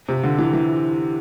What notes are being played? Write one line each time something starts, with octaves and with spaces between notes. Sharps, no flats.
C3
D3
E3
E3